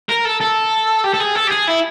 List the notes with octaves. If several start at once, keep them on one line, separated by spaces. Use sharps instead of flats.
A#4
A4
A4
G4
A4
G#4
A4
G4
G#4
E4